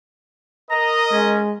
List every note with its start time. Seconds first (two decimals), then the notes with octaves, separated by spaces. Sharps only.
0.70 A#4 D#5 A#5
1.12 G#3 C#4